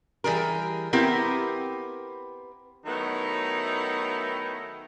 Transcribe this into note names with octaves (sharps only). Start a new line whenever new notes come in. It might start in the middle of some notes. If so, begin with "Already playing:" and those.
E3 G3 G#4 A#4
B3 C4 E4 G4 A#4
D#3 F#3 A3 B3 D#4 E4